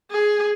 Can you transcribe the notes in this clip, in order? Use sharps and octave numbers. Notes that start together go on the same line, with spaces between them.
G#4